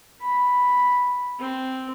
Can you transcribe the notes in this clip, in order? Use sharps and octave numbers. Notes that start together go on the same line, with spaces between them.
B5
C4